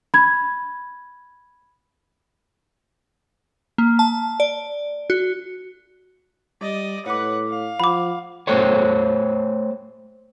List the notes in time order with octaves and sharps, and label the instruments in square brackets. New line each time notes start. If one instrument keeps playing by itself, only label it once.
[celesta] B5 G#6
[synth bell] A#3
A5
D5
F#4
[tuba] G3 [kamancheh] D5 D#5
[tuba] A2 [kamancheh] B4 F#5 [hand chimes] C#5 D6
[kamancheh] F5
[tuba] F3 [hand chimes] F#5 [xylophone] B5 D6
[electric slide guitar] A3 G4 C5 C#5